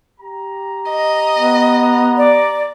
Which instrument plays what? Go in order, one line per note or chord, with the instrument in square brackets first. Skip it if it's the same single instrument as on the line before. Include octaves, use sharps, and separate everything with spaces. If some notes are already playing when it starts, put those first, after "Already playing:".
[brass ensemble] G4 A#5
[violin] D#5
[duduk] B3
[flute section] D5